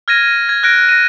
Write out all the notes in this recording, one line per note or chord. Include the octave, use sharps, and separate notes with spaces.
F6 G#6 A#6 D#7
G#6
F6 F#6 A#6 D7
A#6 D#7